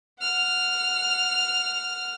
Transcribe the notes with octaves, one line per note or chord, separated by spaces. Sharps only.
F#5 F6